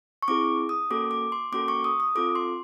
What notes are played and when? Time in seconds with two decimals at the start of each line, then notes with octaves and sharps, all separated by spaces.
0.22 C#6
0.28 C4 E4 G#4 D6
0.69 D#6
0.90 A#3 C#4 F#4 A4 D6
1.11 D6
1.32 C6
1.52 A#3 C#4 F#4 A4 D6
1.68 C#6
1.84 D#6
2.00 D#6
2.15 C4 F4 A4 D6
2.35 C6